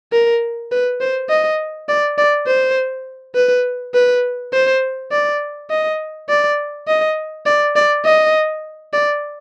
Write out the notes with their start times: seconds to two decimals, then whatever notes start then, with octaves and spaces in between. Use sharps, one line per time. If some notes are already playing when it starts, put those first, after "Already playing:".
0.12 A#4
0.71 B4
1.01 C5
1.30 D#5
1.89 D5
2.18 D5
2.47 C5
3.35 B4
3.94 B4
4.53 C5
5.11 D5
5.70 D#5
6.29 D5
6.87 D#5
7.46 D5
7.76 D5
8.05 D#5
8.93 D5